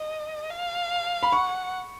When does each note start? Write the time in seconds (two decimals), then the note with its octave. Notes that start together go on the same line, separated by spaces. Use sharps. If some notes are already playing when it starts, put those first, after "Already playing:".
Already playing: D#5
0.50 F5
1.23 B5
1.32 F#5 C#6